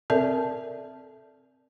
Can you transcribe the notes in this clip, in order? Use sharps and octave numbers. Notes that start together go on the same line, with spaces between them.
C4 A4 A#4 D5 E5 A5